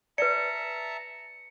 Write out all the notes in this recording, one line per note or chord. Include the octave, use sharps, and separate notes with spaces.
B4 D5 E5 A5 A#5 C#7